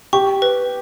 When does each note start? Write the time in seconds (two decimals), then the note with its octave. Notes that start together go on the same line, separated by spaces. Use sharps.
0.13 G4 C#6
0.42 B4